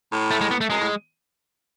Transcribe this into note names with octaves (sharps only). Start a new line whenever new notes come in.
A2
A3
G#3
B3
A3
F#2 G#3
A2